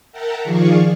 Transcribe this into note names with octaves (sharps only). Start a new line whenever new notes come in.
A#4 E5 F#5 G5 A5 A#5
D#3 F3 G#4 D5 F5 C#6